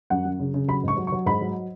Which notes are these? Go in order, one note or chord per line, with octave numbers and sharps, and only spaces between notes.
F#2 F#5
F#2
C#3
C#3
F#3 B5
G#2 C#6
F#3
C#6
F#3
G#2 B5
F#3